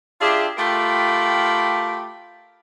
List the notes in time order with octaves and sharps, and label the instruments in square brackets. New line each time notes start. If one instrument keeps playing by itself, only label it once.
[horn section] D4 F4 G4 G#4 E5
A3 F4 G4 A#4 G5 B5